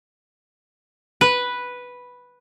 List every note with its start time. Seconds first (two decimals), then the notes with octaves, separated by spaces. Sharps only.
1.21 B4